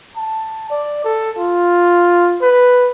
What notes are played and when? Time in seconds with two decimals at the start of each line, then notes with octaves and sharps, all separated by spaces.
0.16 A5
0.70 D5
1.04 A4
1.38 F4
2.41 B4